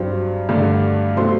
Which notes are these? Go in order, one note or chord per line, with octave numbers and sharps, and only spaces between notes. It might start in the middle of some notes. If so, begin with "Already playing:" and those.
Already playing: G2 F#3 C4
G2 D3 A3 D4
B2 F#3 A3 C4 C6